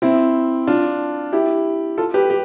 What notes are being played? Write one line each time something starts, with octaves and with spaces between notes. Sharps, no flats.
C4 E4
D4 F4
E4 G4
F4 A4
G4 B4
G4